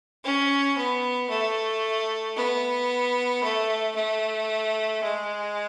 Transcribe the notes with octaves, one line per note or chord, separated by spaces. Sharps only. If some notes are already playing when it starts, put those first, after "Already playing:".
C#4
B3
A3
B3
A3
A3
G#3